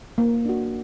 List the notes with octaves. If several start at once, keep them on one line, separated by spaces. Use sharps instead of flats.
A#3
D4 F#4